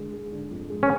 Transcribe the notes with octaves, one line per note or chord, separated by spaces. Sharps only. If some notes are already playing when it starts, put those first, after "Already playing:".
Already playing: D3 G#3
G#3
D3
F2
G#3
C#4